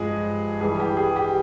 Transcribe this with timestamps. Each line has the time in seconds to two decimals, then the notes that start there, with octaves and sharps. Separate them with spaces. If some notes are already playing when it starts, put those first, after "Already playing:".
Already playing: G2 F3 G#3 G#4
0.61 G2 E3 G3 G#4
0.80 G4
0.97 G#4
1.16 G4